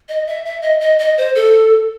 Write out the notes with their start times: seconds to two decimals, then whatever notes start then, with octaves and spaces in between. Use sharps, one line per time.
0.09 D#5
0.27 E5
0.45 E5
0.62 D#5
0.81 D#5
0.99 D#5
1.18 C5
1.35 A4